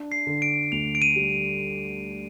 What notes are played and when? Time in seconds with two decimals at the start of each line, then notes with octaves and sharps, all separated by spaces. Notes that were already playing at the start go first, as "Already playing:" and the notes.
Already playing: D4
0.12 C7
0.27 D3
0.42 D7
0.72 D2 F7
0.95 D7
1.02 D#7
1.16 G3